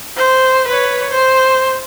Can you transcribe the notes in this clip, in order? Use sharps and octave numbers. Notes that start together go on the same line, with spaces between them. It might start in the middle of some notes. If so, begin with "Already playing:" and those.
C5
B4 C#5
C5